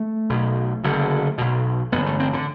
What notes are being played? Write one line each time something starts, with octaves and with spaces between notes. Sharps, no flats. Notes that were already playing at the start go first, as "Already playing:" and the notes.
Already playing: A3
B1 B2
F#1 F#2 D3
B1 B2
A1 G2 D3 B3
A3
C4
D3